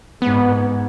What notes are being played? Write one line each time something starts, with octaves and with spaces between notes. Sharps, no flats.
G#2 B3